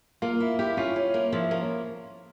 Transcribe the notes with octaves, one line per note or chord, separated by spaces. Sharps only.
A#3 F4
E4
E4 G4
C#4 F4
C#4
A#3
F3 E4
A#3 C#4